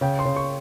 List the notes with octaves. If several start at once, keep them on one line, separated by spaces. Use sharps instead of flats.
C#3 G5
C6
C#3
C#6